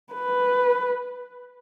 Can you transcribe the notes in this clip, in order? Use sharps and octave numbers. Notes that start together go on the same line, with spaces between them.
B4